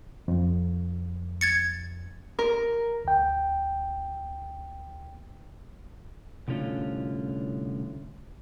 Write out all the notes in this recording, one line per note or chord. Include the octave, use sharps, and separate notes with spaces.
F2
G#6 A6 C#7
A#4
D2 G5
C2 A2 D3 C#4 F4